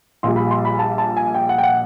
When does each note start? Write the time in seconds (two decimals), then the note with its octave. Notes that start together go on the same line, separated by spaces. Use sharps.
0.23 A#1 A#2 G3 C6
0.36 B5
0.51 C6
0.65 B5
0.79 A5
0.98 A5
1.17 G#5
1.35 G5
1.49 F#5
1.58 G5
1.63 F#5